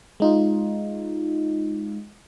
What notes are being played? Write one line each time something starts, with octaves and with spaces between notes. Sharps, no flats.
G#3 D#4 F4